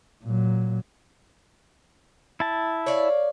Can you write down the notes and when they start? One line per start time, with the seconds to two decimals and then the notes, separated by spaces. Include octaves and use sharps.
0.24 A#2 F#3
2.40 E4 A5
2.86 C#5 D5 F5